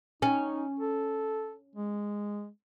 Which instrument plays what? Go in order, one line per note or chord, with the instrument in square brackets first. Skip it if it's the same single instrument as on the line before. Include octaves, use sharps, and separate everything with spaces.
[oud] C#4 [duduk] D#4
[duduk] A4
G#3